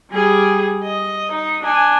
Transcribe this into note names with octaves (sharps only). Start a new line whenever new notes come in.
G3 G#4
D#5
D#4
D4 G#5